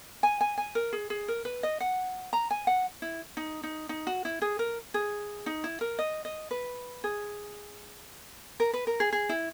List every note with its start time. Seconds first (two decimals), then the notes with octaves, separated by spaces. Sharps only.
0.23 G#5
0.41 G#5
0.58 G#5
0.75 A#4
0.93 G#4
1.10 G#4
1.28 A#4
1.45 B4
1.63 D#5
1.80 F#5
2.33 A#5
2.51 G#5
2.67 F#5
3.02 E4
3.37 D#4
3.63 D#4
3.89 D#4
4.07 F#4
4.25 E4
4.42 G#4
4.59 A#4
4.94 G#4
5.46 D#4
5.64 E4
5.81 A#4
5.99 D#5
6.25 D#5
6.51 B4
7.04 G#4
8.60 A#4
8.74 B4
8.87 A#4
9.00 G#4
9.13 G#4
9.29 E4